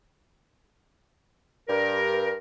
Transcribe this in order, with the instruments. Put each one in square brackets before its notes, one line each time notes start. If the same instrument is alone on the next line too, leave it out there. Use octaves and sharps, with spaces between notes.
[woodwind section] G2 A#4